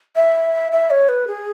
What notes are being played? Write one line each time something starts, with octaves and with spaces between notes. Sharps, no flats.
E5
E5
C#5
B4
G#4